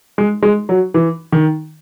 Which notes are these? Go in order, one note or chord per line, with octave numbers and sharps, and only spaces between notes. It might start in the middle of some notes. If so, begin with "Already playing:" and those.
G#3
G#3
F#3
E3
D#3